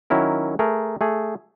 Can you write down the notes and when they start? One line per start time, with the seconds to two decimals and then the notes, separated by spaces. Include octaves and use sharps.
0.10 D#3 F#3 C#4 E4 A#4
0.59 A3 G#4 A#4
1.01 A3 G#4